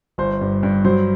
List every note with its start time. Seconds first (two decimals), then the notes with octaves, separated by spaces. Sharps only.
0.18 G1 C5
0.41 G2
0.63 G2
0.85 F#3 C5